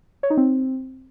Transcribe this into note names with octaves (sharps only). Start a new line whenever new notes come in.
C#5
D#4
C4